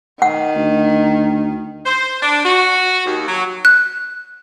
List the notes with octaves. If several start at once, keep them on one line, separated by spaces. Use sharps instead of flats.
D#3 F#5
D2
C5
D4
F#4
D#2
F#3
F#6